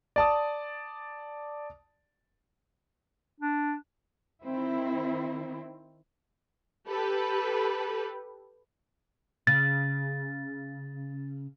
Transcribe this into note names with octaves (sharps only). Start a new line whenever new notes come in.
D5 A5 D#6
D4
D#3 C4 E4
G4 A4 B4
C#3 A6